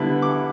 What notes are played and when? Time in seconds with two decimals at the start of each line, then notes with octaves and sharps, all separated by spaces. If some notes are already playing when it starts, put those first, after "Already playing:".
Already playing: D3 G3 B3 E4
0.22 D6